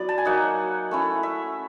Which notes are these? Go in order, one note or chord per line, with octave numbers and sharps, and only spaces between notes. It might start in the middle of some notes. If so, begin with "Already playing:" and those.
Already playing: F#3 B3 E4 D5
A5
G#5
F#3 A#3 D#4 F#5
A3 C#4 E4
E5